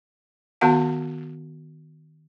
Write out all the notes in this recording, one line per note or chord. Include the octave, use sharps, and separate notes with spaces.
D#3 B3 F#4 F5 A5